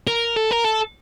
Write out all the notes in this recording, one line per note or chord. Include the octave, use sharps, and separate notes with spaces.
A#4
A4
A#4
A4